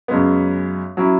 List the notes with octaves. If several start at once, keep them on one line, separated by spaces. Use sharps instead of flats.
F#2 C#3 G#3 B3
F#3 C#4 E4